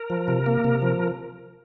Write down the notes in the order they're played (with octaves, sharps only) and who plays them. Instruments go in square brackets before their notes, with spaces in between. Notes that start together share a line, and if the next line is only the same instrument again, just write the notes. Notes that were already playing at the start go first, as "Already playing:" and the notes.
Already playing: [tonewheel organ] A#4
F3
C3
A#3
C3
F3